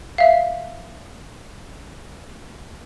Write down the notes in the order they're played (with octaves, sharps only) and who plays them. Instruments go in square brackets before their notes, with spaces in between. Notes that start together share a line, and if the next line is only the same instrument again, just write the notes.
[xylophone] E5 F5